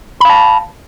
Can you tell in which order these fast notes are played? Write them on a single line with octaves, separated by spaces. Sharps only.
B5 F5 A5